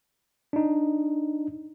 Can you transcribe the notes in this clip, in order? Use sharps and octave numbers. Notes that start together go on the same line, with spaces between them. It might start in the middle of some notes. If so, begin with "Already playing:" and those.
D4 D#4